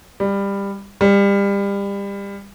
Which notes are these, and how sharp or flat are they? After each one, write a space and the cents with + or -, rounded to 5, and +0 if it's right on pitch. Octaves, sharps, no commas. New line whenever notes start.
G3 +20
G3 +30